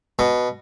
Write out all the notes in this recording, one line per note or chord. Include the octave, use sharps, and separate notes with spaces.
B2